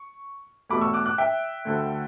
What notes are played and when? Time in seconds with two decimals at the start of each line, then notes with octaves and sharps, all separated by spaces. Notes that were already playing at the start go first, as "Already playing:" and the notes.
Already playing: C#6
0.70 E2 B2 A3 B5 D6
0.81 C#6 E6
0.93 D6 F#6
1.06 D6 F#6
1.18 E5 G5
1.65 D2 D3 A3